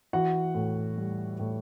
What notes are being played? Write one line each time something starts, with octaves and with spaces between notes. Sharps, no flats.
E3 F#4 F#5
A2
G3
A2